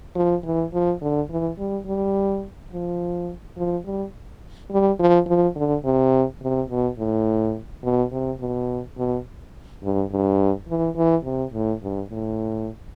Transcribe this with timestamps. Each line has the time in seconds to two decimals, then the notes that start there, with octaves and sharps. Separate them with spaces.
0.15 F3
0.45 E3
0.73 F3
1.01 D3
1.30 E3
1.58 G3
1.86 G3
2.72 F3
3.57 F3
3.85 G3
4.71 G3
5.00 F3
5.27 F3
5.56 D3
5.85 C3
6.42 C3
6.69 B2
6.98 A2
7.84 B2
8.12 C3
8.40 B2
8.98 B2
9.83 G2
10.12 G2
10.69 E3
10.96 E3
11.24 C3
11.53 A2
11.82 G2
12.10 A2